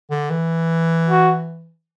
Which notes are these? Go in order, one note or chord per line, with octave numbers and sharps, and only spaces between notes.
D3
E3
F#4